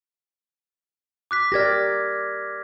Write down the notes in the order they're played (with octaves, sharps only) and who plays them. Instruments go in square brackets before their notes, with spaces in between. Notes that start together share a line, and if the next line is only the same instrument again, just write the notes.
[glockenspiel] D6 F#6 B6
[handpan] G4 A#4 D5 [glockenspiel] F6 G#6 A#6